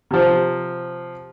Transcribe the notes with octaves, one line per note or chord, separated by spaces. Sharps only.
C3 F3